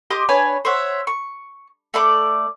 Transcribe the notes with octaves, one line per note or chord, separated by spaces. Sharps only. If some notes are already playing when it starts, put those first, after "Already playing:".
G4 D#5 C6 D6
D4 B4 C#5 G#5
C5 C#5 E5 F#5
C#6
A3 D5 C6 D6